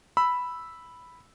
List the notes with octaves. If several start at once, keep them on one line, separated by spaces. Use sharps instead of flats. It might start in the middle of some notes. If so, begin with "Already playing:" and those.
B5 E6